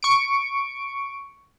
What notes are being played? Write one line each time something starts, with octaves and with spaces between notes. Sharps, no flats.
C#6 D7